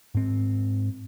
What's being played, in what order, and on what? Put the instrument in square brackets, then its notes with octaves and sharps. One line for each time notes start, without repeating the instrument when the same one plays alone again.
[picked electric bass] G#2 C4